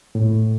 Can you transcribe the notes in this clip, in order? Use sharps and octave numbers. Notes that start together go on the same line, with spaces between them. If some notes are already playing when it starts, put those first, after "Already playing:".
A2